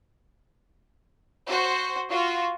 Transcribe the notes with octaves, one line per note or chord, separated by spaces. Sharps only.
F#4 C5
F4 F#4